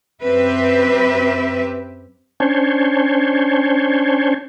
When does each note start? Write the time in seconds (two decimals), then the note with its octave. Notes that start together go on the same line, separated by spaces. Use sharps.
0.22 F#2 C4 G4 B4 E5
2.40 C#4 D4 C5 C#5